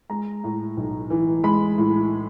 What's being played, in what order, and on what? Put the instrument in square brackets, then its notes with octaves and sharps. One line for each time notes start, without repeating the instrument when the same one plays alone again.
[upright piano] G#3 A#5
A2
B1
E3
G#3 B5
A2